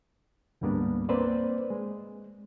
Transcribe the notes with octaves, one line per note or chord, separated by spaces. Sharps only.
D2 G#2 G3 A#3 B3 D4
A#3 C4 B4 C5 D5
G#3